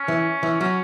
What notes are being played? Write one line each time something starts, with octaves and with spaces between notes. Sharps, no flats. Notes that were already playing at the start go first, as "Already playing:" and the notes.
Already playing: C#4
E3
E3
F#3 C#4